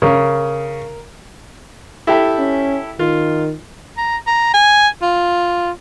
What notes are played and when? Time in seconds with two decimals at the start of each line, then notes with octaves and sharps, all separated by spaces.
0.02 C#3 A#4
2.07 E4 G4 A4
2.39 C#4
2.99 D#3 F4
3.97 A#5
4.27 A#5
4.54 G#5
5.02 F4